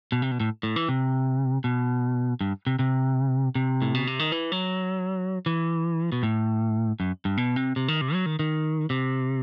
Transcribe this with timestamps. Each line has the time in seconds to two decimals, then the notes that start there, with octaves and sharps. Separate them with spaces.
0.12 B2
0.22 C3
0.31 B2
0.40 A2
0.63 A2
0.76 E3
0.89 C3
1.64 B2
2.41 G2
2.67 C3
2.79 C3
3.55 C3
3.82 A2
3.95 B2
4.07 C3
4.19 D#3
4.32 E3
4.52 F#3
5.46 E3
6.12 B2
6.23 A2
7.00 F#2
7.25 G2
7.37 B2
7.56 C3
7.76 C3
7.88 D#3
8.01 C3
8.13 F#3
8.26 D#3
8.39 D#3
8.90 C3